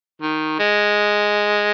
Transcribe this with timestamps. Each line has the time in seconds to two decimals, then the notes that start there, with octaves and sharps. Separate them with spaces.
0.22 D#3
0.59 G#3